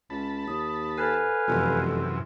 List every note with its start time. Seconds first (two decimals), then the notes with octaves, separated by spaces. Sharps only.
0.10 C#2 A5 B5
0.48 D#2 D#6
0.97 A4 B4 C5 F5 G#5
1.48 F1 F#2 C3 E3